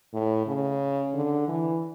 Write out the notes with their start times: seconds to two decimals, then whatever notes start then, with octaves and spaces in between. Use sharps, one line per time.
0.13 A2
0.47 C#3
1.14 D3
1.48 E3